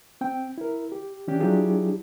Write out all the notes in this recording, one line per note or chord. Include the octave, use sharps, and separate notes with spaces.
C4 G5
E4 A#4
G4
E3 C#4 D4 G4
F#3 D4 E4 F4 G4 G#4